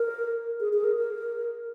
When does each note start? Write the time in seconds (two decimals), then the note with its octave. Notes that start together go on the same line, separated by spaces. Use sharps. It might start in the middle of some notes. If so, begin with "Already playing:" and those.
Already playing: A#4
0.60 G#4
0.73 G#4
0.84 A#4
0.96 A#4